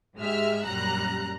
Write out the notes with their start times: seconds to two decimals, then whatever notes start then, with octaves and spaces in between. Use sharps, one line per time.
0.18 G#2 G#3 G4 E5 E6 F6
0.64 A#1 F#2 G3 A#5 F#6